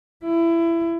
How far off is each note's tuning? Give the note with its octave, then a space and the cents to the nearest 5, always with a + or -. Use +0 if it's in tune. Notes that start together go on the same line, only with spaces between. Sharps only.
E4 +20